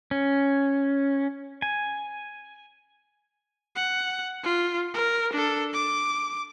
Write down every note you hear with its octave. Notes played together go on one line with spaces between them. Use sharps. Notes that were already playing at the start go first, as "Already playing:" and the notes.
C#4
G#5
F#5
F4
A#4
D4 A4
D6